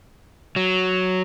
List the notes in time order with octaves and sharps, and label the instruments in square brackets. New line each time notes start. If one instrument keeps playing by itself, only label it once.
[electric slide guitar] F#3